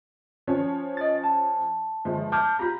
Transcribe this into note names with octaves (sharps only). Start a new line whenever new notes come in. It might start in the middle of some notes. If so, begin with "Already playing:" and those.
F3 C#4 C#5
D#5 A6
A5
G1 F3 G#3
A5 D6 F6 G6
F4 G4 A#5 B5